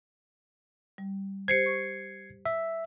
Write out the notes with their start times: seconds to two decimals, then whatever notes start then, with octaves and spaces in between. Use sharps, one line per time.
0.98 G3
1.48 G4 C5 G#6 C7 C#7
1.66 C#6
2.46 E5